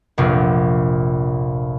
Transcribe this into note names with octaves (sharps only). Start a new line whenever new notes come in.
F1 A#1